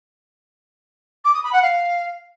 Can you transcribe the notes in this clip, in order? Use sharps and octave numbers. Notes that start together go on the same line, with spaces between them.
D6
D#6
B5
F#5
F5